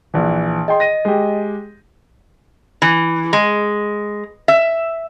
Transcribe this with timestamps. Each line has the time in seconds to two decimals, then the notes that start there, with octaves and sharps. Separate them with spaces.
0.14 A#1 E3
0.68 G#4 D#5 G5 C6
0.80 A#6 D#7
1.05 G#3 G4
2.82 E3
3.33 G#3
4.48 E5